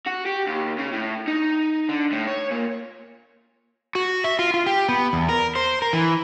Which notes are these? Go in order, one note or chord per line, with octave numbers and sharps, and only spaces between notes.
F#4
G4
D#2
C#3
A2
D#4
D3
A2
C#5
A#2
F#4
E5
F4
F4
G4
B3
E2
A#4
C5
A#4
E3